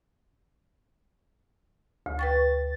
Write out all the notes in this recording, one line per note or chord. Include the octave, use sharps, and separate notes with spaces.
D2
B4 G5 C#6 A6